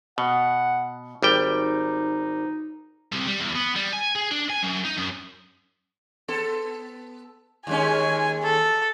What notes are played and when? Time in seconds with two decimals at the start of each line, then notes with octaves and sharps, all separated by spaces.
0.18 B2 F#5
1.23 G#1 G3 D#4 G5
3.12 C2
3.27 G3
3.40 E2
3.56 B3
3.76 G3
3.93 G#5
4.16 G#4
4.31 D4
4.50 G#5
4.63 F#2
4.85 D#4
4.98 F#2
6.28 B3 A4
7.67 D#2 G#3 C#4 G#5
8.43 A4